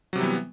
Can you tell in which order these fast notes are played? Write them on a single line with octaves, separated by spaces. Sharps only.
F#3 C3 G3 E3 B3